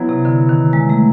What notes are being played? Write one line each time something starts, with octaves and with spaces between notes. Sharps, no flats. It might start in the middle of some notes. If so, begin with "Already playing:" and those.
Already playing: F#3 B3 E4
C3
D3
D#3
G#3
A3